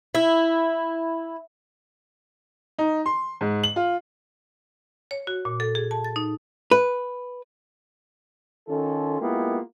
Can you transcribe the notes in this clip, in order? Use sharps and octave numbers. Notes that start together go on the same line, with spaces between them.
E4
D#4
C6
G#2
F#7
F4
C#5
F#4
A#2
A4
G#4
A5
A6
D#4
B4
D#3 C#4 F4 A4
G#3 A#3 B3 E4 F4 G4